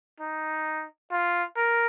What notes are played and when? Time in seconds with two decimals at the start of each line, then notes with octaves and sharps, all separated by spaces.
0.20 D#4
1.11 F4
1.56 A#4